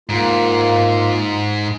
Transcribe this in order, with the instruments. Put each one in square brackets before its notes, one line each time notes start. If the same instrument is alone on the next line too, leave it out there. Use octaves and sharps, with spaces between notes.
[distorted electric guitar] G#2 [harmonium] A#3 F4